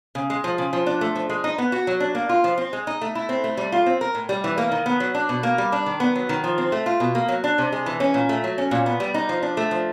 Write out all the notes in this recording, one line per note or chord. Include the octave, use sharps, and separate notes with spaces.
C#3
G#3
F3
C#3
F3
D4
A3
F3
G#3
D#4
B3
F#4
F#3
D4
A#3
F4
F3
C4
G#3
D#4
A3
E4
C4
A3
G3
F4
C4
A#4
A2
G3
E3
A#3
D#3
B3
F#3
D4
B2
A#3
G3
D4
D#3
B3
F#3
D#3
F3
C4
A3
F4
B2
A#3
F#3
D4
C3
G#3
E3
C#4
A#2
A3
F#3
C#4
A#2
B3
G3
D#4
F3
D4
A3
F3